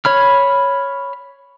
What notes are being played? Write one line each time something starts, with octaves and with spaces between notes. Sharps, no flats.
C#5 B5 F6